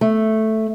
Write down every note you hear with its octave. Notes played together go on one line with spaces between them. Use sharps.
A3